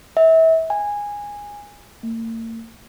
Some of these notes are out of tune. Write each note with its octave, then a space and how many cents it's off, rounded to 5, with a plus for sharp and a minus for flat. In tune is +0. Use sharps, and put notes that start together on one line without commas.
E5 -30
G#5 -15
A#3 -45